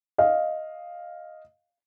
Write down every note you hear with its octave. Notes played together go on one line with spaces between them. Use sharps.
D#5 F5